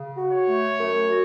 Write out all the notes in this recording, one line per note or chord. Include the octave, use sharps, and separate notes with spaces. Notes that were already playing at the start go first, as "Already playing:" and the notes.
Already playing: C#3
F#4
C#5
A3
F#2
F#4